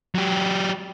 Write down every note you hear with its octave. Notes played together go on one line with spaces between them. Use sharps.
F#3 G4